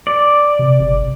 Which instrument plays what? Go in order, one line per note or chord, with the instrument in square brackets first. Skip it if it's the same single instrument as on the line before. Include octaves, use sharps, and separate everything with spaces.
[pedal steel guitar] D5
[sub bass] C3
G1